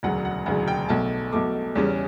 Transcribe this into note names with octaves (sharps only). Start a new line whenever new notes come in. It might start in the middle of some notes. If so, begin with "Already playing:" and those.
E1 D2 C#3 F#3 F#5
F#5
E1 D2 C#3 F#3 F#5
G5
B1 B2 A3 A5
B1 B2 A3 D6
E2 C#3 G3 C#4